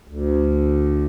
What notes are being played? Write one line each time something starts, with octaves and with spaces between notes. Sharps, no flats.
D2